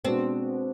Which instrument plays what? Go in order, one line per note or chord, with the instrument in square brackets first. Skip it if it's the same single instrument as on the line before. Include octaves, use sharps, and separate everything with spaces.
[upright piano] B2 G#3 B3 D4 F#4 [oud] C4